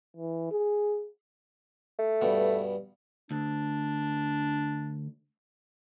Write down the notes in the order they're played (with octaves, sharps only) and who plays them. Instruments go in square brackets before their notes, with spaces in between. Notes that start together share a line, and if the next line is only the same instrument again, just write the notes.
[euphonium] E3
G#4
[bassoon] A3
[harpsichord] G2 B2
[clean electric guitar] D2 [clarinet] D4